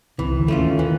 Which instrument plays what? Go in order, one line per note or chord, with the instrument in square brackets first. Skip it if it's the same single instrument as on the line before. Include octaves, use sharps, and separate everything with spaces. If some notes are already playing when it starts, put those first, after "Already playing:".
[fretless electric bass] C2 C3 [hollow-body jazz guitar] E3
[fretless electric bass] D2 D3
[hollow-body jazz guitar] A3 C#4 F4
[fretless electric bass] D#2 D#3
[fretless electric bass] D#3 [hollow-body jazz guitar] E3